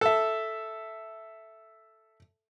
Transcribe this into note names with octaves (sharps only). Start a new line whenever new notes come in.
A4 E5